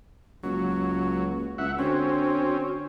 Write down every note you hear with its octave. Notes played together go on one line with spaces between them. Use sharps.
C#2 F#3 A#3
C#2 E5 F#5
D3 C4 C#4 F#4